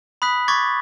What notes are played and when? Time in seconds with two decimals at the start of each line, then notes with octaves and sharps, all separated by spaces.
0.22 B5 D#6 F#6 B6
0.48 C#6 D6 G#6 A6 B6